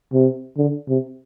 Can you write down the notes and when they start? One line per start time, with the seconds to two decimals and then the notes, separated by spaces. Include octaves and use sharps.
0.13 C3
0.57 D3
0.88 C3